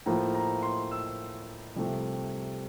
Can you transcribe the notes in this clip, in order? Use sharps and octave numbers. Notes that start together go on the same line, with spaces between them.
A2 F3 A#3 A#5
A#5
C6
E6
C2 C3 F3 A3